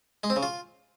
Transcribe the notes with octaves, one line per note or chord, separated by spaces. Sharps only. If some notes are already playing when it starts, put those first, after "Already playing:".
G#3
C4
C#3
F4